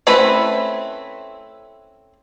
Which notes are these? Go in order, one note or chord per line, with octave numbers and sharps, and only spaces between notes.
A3 C4 C#4 E4 B4